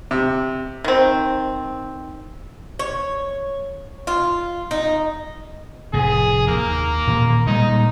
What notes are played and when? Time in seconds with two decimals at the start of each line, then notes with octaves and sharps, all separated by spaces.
0.11 C3
0.84 D#3 C4
2.79 C#5
4.07 F4
4.71 D#4
5.93 F1 A2 G#4
6.47 D#2 A#3
7.07 A#2 D#3
7.47 A#2 G3 G#3 D#4